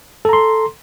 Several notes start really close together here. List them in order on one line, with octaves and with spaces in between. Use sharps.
A4 A#5 C6